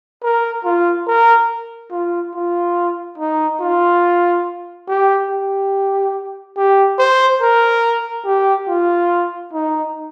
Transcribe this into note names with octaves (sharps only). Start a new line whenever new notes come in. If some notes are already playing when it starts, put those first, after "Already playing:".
A#4
F4
A#4
F4
F4
D#4
F4
G4
G4
G4
C5
A#4
G4
F4
D#4